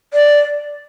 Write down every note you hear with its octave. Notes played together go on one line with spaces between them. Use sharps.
D5